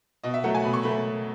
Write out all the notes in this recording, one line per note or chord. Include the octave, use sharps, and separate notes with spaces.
B2 D#5
E5
F#3 A3 F#5
G#5
B2 B5
C#6
F#3 A3 B5